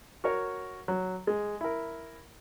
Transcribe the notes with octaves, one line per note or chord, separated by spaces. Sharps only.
F#4 A#4 C#5
F#3
G#3
E4 A#4